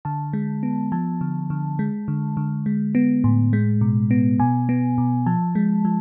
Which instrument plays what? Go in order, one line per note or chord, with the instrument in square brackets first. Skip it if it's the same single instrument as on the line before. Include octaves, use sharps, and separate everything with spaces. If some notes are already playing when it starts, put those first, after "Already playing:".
[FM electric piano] D3 A5
G#3
B3
F3 A5
D3
D3
G#3
D3
D3
G#3
B3
A2
G#3
B2
B3
B2 G#5
B3
B2
F3 A5
G#3
F3